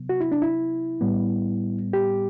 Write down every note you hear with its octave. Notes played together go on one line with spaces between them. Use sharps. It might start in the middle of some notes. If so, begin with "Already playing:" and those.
Already playing: C3 F#3 B3
F#4
E4
D4
E4
A2 G3 B3
G4